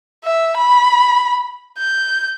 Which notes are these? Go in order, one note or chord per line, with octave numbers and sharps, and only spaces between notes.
E5
B5
G6